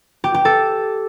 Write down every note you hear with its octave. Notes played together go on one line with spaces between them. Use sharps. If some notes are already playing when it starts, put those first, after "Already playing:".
G4
G4
A4